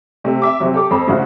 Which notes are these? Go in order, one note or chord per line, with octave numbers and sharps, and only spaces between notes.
C3 A3
E5 D6
C3 F3 F#3
G4 A4 D6
F2 A4 B5
A2 C#3 F3 D4 E4 F#4